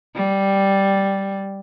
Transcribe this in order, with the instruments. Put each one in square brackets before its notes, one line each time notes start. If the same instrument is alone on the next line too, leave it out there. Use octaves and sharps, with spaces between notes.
[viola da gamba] G3